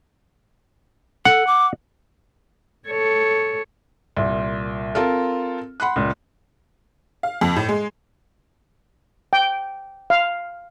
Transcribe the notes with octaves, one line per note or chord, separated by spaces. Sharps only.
A4 F#5
D6
A4 C#5
C2 A#2
C4 F4 A4 A#4
F#5 B5 C6 F#6
C#2 A#2
F5
F2
A2
G#3
G5
F5